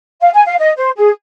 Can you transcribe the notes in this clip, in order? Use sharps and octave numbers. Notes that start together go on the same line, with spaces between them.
F5
G#5
F5
D#5
C5
G#4